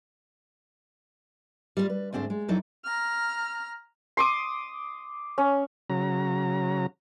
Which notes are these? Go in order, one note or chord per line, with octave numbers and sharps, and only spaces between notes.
G3 C#4 F4
B4
D2 G#2 C4 D4 C5
G#3
F2 F#3 D#4 E4 D5
A#5 F6
C6 D6 D#6
C#4
C#3 F#3 A#5